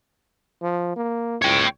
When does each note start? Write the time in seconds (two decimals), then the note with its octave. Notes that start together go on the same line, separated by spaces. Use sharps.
0.62 F3
0.96 A#3
1.42 C#2 C#5 G5